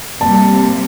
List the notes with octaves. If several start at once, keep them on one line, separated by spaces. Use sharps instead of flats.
C3 G3 A#3 A5